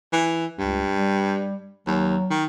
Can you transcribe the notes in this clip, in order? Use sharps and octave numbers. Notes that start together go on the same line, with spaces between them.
E3
C#2 G2
G3
D#2 F#3
D#3